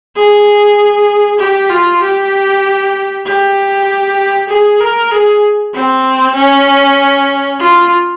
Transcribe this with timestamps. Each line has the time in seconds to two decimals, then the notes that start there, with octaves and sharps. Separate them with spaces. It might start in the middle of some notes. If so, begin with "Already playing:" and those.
0.16 G#4
1.39 G4
1.70 F4
2.01 G4
3.25 G4
4.49 G#4
4.80 A#4
5.11 G#4
5.74 C4
6.35 C#4
7.60 F4